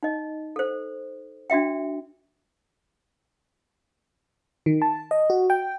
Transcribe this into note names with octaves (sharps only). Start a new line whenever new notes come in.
D#4 D#5
A4 C5
D4 F#4 E5 G5
D#3
A5
D#5
F#4
G5